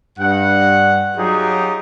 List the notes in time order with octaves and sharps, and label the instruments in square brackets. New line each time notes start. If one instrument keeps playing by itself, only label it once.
[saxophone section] G2 [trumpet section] F#5
[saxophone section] F#3 G#4 [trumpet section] D#4 F4 G4